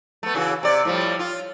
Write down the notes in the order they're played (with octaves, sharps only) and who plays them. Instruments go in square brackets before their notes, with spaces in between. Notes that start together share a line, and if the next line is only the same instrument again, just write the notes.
[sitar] A3 B3
C#3 E3 F#4
C3 D5
A2 F3 G3
F4